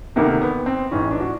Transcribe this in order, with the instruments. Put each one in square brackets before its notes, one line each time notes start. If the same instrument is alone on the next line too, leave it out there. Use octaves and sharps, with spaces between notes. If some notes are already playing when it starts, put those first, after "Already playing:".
[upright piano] D2 C3 D#3 A#3
B3
C4
A1 G#2 E3 C#4
D4
F#4